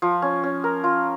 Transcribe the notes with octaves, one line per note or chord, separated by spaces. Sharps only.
F3
C#4
C#4
A#4
F4